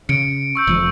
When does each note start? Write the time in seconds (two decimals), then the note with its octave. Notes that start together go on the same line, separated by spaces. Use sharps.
0.09 C#3 C#7 D7
0.55 C#6 E6 G6
0.67 F1 F2 F3